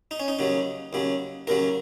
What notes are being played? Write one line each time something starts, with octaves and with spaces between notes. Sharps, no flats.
D#4
C#4
D#4
D#2 C#3 F#3
D#2 C#3 F#3
D#2 C#3 F#3 A#4